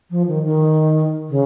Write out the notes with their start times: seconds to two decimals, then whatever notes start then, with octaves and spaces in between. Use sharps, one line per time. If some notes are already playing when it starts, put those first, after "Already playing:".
0.10 F3
0.27 D#3
0.44 D#3
1.29 C#3